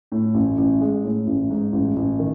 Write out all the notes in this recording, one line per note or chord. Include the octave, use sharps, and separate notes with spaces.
A2
A1
A1
G#3
A2
A1
G#2
A1
A1
D#3